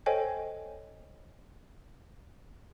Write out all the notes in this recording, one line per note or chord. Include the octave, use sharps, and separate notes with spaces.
A4 C5 C#5 D#5 G5 G#5